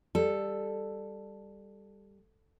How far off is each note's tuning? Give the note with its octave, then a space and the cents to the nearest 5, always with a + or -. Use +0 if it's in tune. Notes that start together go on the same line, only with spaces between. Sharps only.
G3 +15 A4 +0